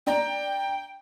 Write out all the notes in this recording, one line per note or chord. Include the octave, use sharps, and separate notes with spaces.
D4 D5 G5 A#5